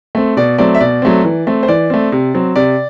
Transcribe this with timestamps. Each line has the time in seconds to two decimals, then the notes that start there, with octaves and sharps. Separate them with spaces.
0.15 A3 C4
0.37 B2 D5
0.58 F#3 A3 C4 D5
0.75 E5
0.80 B2 D5
1.02 F#3 A3 C4
1.24 E3
1.47 A3 C4
1.63 C5
1.68 E3 D5
1.90 A3 C4
2.12 C3
2.34 F#3 C4
2.56 C3 D5